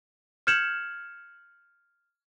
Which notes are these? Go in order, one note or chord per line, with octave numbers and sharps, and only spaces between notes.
F6 G6 G#6 C#7 E7 F#7